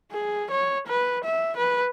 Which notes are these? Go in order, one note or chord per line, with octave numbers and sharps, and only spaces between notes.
G#4
C#5
B4
E5
B4